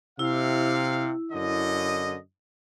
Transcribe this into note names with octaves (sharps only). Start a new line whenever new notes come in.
C3 E4 F5
F#2 D3 D#5